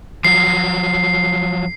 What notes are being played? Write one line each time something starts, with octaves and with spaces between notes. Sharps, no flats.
F3 F#3 C7